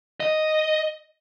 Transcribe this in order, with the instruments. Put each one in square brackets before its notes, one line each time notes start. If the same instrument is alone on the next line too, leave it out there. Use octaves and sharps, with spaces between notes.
[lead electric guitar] D#5